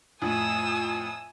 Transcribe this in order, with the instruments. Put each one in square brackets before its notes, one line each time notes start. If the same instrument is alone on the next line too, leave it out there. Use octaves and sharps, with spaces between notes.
[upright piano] F2 A2 [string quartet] G#5 D#6 E6